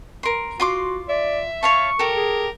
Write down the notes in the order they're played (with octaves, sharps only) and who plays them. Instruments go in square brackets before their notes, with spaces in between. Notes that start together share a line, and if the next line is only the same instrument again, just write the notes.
[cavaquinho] A#4 C6
[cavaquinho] F4 C6 D6 [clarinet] F#4
[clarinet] D5 [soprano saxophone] E5
[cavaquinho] C#5 F5 A5 [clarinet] C#6
[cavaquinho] G4 A4 [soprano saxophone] A#4
[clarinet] G#4